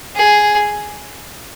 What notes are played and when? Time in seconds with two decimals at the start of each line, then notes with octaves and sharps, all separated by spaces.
0.16 G#4